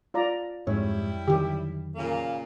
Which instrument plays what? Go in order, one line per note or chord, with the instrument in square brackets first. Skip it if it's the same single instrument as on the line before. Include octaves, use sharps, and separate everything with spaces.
[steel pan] F4 D5 A#5
[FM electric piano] F2 [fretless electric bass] G#2 [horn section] G3 E4 [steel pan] C#5
[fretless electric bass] D3 D#3 F#3 [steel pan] G4
[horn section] A#2 C#3 A#3